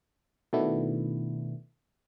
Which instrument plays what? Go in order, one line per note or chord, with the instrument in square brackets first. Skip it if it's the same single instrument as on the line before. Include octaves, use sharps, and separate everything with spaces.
[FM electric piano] B2 D#3 A3 B3 D4 E4